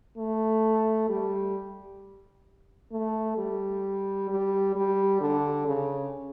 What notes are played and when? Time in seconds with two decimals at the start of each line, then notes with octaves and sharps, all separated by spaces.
0.18 A3
1.09 G3
2.92 A3
3.38 G3
4.30 G3
4.76 G3
5.21 D3
5.67 C#3